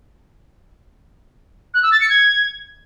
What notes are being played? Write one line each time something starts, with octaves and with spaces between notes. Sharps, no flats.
F#6
E6
A6
C#7
G#6